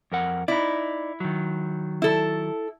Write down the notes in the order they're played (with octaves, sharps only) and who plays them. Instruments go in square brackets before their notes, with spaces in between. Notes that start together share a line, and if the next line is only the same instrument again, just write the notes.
[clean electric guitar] F2 A#4 F#5
[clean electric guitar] D#4 D5 [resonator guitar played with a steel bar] E4
[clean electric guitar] D#3 F#3
[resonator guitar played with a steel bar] E4 A4